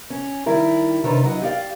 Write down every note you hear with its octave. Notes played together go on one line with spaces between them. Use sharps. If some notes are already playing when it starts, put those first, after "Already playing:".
C#4
D#3 G3 E4 A#4
C3 D#3 D4 B4 C#5
F#3 E4 D#5 F#5
G4 D5 F5 G5